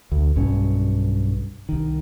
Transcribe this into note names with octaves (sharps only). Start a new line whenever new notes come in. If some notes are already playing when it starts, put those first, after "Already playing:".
D2
B1 G2 C#4
C2 D#3